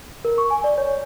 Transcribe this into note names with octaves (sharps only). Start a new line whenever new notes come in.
A#4
C#6
G#5
D5
C#5